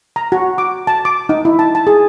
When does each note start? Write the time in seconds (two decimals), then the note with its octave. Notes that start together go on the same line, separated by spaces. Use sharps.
0.16 A#5
0.32 F#4
0.58 D6
0.87 A5
1.05 D6
1.29 D#4
1.45 E4
1.59 A5
1.75 A5
1.87 G#4